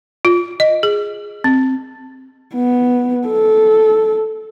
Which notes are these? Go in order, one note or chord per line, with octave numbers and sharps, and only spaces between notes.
F4
D#5
G#4
C4
B3
A4